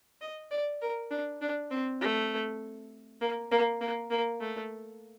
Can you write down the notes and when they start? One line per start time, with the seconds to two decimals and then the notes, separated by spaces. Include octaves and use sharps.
0.21 D#5
0.51 D5
0.82 A#4
1.11 D4
1.41 D4
1.71 C4
2.01 A3
3.21 A#3
3.51 A#3
3.81 A#3
4.10 A#3
4.40 A3